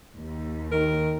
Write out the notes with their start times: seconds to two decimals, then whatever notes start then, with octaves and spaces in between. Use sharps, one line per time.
0.16 D#2
0.72 D#3 A#4